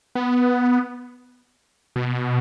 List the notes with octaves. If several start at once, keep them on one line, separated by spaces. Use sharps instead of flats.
B3
B2